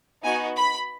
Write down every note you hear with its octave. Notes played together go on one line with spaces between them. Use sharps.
B3 D#4 F#4 G#5
B5